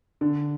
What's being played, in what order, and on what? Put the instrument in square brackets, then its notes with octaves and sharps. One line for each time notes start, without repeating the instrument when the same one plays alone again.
[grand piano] D3